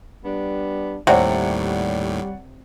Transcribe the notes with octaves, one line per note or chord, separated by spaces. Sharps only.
G3 B3 D4
D#2 A2 C3 G3 C#5 D5 F#5